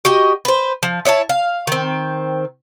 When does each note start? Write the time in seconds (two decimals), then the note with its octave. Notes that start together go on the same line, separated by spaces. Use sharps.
0.05 F#4 G4 D#5
0.45 B4 C5
0.83 F3
1.05 E4 C#5 D#5 A5
1.29 F5
1.67 D#3 C4